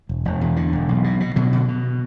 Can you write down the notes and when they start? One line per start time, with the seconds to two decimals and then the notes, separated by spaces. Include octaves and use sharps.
0.09 E1
0.25 E1
0.41 E2
0.56 D3
0.73 E1
0.89 B1
1.04 B2
1.20 B2
1.36 B2 D3 F#3
1.53 B2
1.68 B2